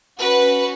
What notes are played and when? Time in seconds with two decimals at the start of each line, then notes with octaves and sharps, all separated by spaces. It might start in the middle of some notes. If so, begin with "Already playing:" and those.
0.19 C#4 F#4 B4